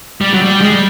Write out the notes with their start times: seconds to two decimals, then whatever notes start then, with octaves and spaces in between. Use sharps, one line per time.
0.21 G3
0.34 F#3
0.42 G3
0.61 G#3
0.72 G3